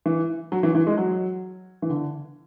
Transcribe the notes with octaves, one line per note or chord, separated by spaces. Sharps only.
E3
F#3
E3
E3
G#3
F#3
E3
D3